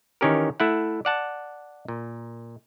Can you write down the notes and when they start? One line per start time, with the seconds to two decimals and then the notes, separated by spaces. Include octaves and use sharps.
0.21 D#3 E3 C#4 G4 A#4
0.60 A3 E4 F#5
1.05 D5 F#5 A5
1.88 A#2